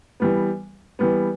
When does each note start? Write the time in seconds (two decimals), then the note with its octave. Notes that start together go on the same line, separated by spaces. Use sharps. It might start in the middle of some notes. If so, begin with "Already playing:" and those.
0.20 E3 G3 B3
0.99 E3 G3 B3